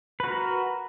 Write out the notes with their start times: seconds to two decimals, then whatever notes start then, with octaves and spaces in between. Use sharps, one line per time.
0.20 B4
0.24 F#4
0.28 A#4